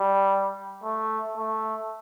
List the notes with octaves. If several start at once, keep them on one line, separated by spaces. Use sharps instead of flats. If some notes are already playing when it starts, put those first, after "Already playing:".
Already playing: G3
A3
A3